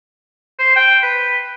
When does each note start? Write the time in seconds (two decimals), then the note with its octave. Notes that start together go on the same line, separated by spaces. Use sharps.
0.59 C5
0.76 G5
1.03 B4